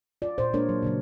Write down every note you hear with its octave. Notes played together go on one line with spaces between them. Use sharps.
F4 D5
A#2 C5
G#3 A#3 D4 A#4 C#5
F#3
A#2 C#3 F#3